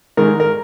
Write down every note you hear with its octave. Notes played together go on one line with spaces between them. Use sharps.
G#2 D#3 G#3 A#4
A#4